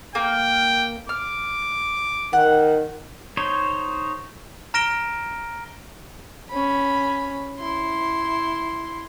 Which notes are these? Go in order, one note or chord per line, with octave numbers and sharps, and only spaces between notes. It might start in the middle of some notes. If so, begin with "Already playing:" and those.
A#3 G5
D6 F6
D#3 F#5
D#4 C5 C#5
A#5 F6 A#6 D7 E7 G7
C#4 B5
E4 C6